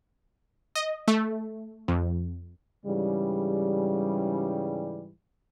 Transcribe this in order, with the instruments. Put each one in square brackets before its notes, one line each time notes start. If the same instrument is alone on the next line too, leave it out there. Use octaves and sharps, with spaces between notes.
[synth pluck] D#5
A3
F2
[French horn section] G#2 C#3 E3 G3